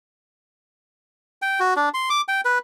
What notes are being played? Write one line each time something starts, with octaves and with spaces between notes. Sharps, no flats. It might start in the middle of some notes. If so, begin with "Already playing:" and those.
G5
F#4
D4
C6
D6
G5
B4